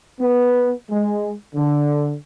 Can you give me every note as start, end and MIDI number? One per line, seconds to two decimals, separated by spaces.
0.20 0.73 59
0.90 1.32 56
1.55 2.15 50